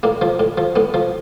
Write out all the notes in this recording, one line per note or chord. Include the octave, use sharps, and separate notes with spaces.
A2 A#3
F3
A2
F3
A2 B3
F3